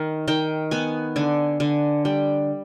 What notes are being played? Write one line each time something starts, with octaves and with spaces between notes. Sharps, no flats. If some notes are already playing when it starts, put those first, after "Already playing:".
Already playing: D#3
D#3 G5
B3 G#5
D3 G#5
D3 G#5
G3 G5